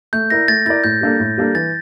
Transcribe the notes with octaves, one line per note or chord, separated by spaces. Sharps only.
A3 G6
E4 A#4 D5 A#6
A3 A6
E4 A#4 D5 A6
A2 G6
G3 A#3 D4 A4
A2
G3 A#3 D4 A4
E3 A6